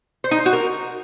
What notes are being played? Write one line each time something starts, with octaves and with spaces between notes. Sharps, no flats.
C5
D#4
C5
F#4
A#4